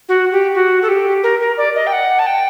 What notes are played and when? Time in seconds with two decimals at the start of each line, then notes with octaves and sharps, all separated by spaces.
0.09 F#4
0.32 G4
0.55 F#4
0.82 A4
0.89 G4
1.23 A#4
1.40 A#4
1.58 D5
1.75 D#5
1.87 G5
1.93 F#5
2.19 A5
2.27 G5